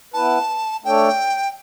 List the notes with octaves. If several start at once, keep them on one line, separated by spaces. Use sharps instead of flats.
B3 E4 B4 A5
A3 D4 A4 C#5 G5